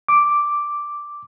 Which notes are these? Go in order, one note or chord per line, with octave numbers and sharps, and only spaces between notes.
D6